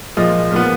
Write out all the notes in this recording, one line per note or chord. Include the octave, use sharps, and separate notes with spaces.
A#2 F3 G#3 D#5
A#2 F3 B3